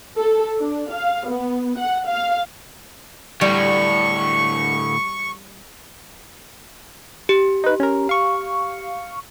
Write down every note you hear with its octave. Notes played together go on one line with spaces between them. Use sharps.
A4
D4
F5
B3
F#5
F5
D2 A2 G3 C#6
G4
D#4 B4
C#4 A#4
F5 C#6